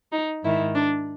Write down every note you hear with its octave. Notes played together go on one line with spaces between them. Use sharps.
D#4
G#2 D#3 E4
D4